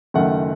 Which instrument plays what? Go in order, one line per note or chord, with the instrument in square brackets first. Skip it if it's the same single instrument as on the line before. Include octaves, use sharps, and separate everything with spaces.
[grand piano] F#1 F#2 D#3 A3 C#4 F#5